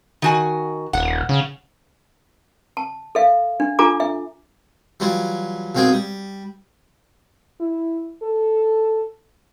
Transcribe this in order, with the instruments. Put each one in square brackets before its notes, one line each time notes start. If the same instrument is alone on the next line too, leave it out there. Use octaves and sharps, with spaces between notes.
[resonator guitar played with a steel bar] D#3 F#4 G#5
[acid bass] D#1 [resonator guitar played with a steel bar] F#5
[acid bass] C#3
[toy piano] A5
A4 E5 F5
D4
D4 F4 A4 G#5 A#5 D6
E5
[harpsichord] E3 F#3 G3 F4
B1 A#2 C4 F#4 G#4 G5
G3
[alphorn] E4
A4